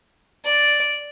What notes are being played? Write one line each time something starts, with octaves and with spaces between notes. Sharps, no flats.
D5